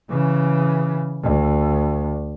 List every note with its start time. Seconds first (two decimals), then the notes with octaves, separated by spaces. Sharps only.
0.10 C#3 E3
1.23 D2